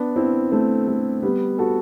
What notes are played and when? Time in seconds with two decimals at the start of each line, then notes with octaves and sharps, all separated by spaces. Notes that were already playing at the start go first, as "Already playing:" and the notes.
Already playing: B3 D4
0.16 C4 E4
0.52 A3 C4
0.88 A3
1.23 G3 B3
1.58 F#4 A4